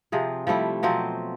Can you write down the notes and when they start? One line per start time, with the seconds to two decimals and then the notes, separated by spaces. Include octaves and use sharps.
0.12 C3 F3 G#4
0.47 F3 G3 A3 E4
0.83 B2 F3 F#3 C4